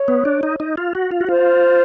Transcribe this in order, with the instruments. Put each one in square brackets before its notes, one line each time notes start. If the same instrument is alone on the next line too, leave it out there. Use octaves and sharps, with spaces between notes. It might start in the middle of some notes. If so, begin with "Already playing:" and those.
Already playing: [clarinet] C#5
[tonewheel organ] B3
D4
D#4
D#4
F4
F#4
F4
F#4
[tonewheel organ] F4 [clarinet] C5